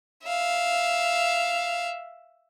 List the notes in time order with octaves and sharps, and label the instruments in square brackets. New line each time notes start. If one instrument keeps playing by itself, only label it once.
[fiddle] E5 F5